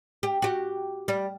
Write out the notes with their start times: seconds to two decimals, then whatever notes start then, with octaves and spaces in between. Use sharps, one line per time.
0.23 G4
0.42 F#4 G4
1.08 G3